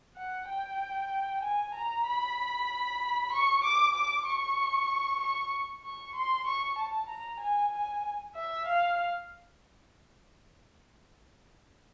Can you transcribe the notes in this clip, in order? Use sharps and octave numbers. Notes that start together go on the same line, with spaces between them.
F#5
G5
G#5
A#5
B5
C#6
D6
D6
C#6
C#6
C#6
C6
C#6
A5
A#5
G#5
G#5
E5
F5